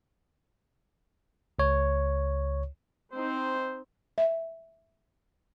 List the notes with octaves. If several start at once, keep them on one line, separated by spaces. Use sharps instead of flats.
C#2 C#5
C4 D#4 C5
E5